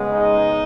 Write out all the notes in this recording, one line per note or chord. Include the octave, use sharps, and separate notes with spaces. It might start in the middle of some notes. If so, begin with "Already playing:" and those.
Already playing: C#3 G#3 B3
D#4